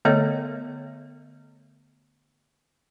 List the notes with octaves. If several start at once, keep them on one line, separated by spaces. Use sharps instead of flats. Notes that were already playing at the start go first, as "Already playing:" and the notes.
D3 A3 B3 A4 C#5 D#5